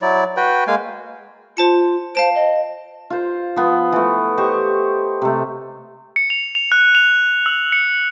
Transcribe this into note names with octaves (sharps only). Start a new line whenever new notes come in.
F#3 E4 D5
F#4 B4 G5
G#3 A#3 F5 G#5
F4 C5 A5 C#7
C5 F5 A5 D7
D#5
F4 C5
F3 B3
E3 A3
G4 C5 D#5 C#6
C3 A3
C#7
F7
F7
F#6
F7
E6
C#7